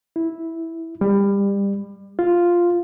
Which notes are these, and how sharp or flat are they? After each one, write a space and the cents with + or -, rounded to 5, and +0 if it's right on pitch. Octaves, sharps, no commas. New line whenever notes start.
E4 -5
G3 +25
F4 +0